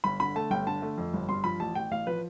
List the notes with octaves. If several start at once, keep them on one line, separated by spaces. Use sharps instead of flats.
G1 B5
D3 B5
A3 A5
G1 G5
D3 A5
A3
F2
G1
G2 C6
F3 B5
A1 A5
A1 G5
A1 F5
F3 B4